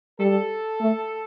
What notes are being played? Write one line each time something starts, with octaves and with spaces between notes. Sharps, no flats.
G3 A4
A3